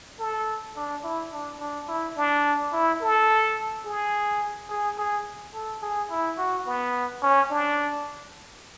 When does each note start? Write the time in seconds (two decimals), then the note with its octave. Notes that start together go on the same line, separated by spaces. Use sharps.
0.19 A4
0.76 D4
1.04 E4
1.32 D4
1.60 D4
1.88 E4
2.16 D4
2.73 E4
3.01 A4
3.85 G#4
4.69 G#4
4.98 G#4
5.54 A4
5.82 G#4
6.10 E4
6.38 F#4
6.66 B3
7.22 C#4
7.50 D4